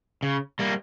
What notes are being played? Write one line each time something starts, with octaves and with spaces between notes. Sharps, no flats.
C#3
G3 A#3